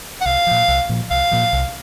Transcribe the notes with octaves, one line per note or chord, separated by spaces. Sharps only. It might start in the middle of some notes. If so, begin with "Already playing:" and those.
F#5
C2 F5
A#2 F3
C2
A#2 F3
C2 F5
A#2 F3
C2